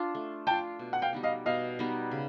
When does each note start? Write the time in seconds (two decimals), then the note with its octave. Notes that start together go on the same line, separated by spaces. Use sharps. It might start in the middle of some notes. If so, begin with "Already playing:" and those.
Already playing: D4 F4
0.15 A3
0.47 D4 F4 G5 A5
0.79 B2
0.93 F#5
1.02 F5 G5
1.13 G3 B3 D#4
1.23 D#5 F5
1.46 B2 D#5 F5
1.79 G3 B3 D#4
2.11 C#3